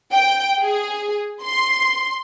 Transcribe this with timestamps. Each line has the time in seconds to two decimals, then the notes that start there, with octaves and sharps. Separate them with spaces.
0.13 G5
0.62 G#4
1.44 C6